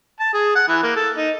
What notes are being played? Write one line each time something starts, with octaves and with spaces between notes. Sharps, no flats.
A5
G#4
F#5
E3
A#3
A4
D#4